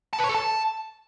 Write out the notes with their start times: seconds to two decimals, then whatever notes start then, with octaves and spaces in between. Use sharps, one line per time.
0.13 A5
0.19 B4
0.24 C#5
0.29 A4
0.35 A5